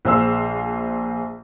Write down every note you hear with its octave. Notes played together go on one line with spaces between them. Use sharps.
A#1 G#4 C5 F5 E6